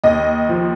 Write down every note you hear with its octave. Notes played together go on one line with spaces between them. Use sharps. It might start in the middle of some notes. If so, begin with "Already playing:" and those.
D#2 D#5
F3